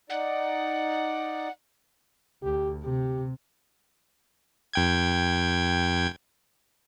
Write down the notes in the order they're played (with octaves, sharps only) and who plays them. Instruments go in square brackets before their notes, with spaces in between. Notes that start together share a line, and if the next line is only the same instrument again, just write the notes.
[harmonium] D#4 D5 [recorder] F#5
[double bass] D2 [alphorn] G4
[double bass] C3 [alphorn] G4
[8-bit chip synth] F2 G5 G#6